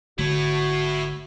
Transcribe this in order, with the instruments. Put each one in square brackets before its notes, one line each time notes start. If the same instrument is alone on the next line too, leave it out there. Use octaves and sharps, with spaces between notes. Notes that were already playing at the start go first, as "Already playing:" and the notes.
[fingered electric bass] G#1 D3 A3 [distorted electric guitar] E4 C#5 [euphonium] F#4